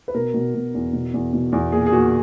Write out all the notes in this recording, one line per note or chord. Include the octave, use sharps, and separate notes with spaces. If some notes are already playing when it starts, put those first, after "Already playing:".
B4
B2 A#4
B2
B2
E2
B2
E2
B2
E2
A#2 G#4
G#4
A#2 F#4